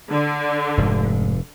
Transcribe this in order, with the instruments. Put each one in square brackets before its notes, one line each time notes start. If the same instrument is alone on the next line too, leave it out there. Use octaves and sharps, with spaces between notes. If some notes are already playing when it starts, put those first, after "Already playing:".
[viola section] D3
[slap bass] F1 [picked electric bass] G#2